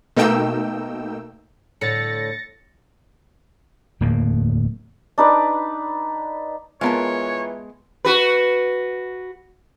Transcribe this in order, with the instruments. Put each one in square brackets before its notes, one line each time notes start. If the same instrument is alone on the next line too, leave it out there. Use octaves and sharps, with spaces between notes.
[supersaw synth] B2 A3 A#3 D#4 G5 E6
[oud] A2 D3 [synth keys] A6 A#6 C#7
[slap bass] D1 E2 A#3
[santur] D4 D#4 B4 D5
[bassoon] E3 [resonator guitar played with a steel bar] G#3 B3 A5 [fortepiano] F4 A#4 [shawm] C#5
[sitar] F#4 B4